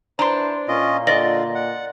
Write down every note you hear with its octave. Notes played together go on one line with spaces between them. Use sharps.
D4 E4 B4 C5 A#5 C6
A#2 C#4 F4 D#5
D3 F4 D5 D#5 A#6
F#5